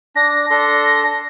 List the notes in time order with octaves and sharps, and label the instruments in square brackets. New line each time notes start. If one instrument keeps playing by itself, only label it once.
[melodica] D4 [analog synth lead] A#6
[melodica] D4 A4 C6